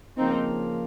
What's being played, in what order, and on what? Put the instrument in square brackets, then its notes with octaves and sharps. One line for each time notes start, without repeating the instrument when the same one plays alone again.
[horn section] C#3 F3 A#3 [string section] C4 D#4